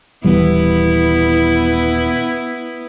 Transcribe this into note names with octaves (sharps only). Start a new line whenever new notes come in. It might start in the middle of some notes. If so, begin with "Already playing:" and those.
D#1 E3 G3 B3 E4